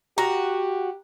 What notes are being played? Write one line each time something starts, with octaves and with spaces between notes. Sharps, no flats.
F#4 G4 A#5